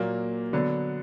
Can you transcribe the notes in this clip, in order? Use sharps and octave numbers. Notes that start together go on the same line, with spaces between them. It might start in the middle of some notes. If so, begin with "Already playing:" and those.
Already playing: A#2 F#3 A#3
D3 F#3 B3